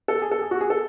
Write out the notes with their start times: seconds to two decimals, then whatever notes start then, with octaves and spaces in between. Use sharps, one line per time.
0.08 A4
0.22 G#4
0.31 A4
0.42 G#4
0.51 F#4
0.61 G#4
0.70 A4